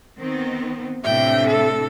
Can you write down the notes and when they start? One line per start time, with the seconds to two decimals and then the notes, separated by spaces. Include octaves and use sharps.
0.19 D#3 B3 C4
1.04 A2 C3 D4 E5 G5
1.47 A4